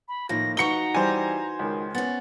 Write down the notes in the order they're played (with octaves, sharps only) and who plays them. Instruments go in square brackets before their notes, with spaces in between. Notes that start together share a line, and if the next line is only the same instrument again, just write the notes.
[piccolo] B5
[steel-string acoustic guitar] A2 D#3 A#3 [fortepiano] F3 [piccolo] A#6
[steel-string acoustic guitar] D#4 F#4 B4 [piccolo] A#5 [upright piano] C#6 C#7 G7
[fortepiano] E3 G3 [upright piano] C5 G#5
[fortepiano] C#2 D#3
[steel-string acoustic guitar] B3 C#4 [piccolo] A6